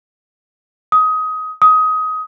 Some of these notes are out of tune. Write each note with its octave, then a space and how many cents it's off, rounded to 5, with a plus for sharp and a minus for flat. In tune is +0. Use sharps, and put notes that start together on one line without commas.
D#6 +20
D#6 +20